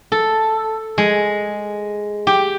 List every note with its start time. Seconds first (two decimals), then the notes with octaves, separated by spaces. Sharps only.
0.12 A4
0.98 G#3
2.27 G4